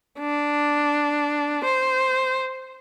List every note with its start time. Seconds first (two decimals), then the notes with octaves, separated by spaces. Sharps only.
0.19 D4
1.64 C5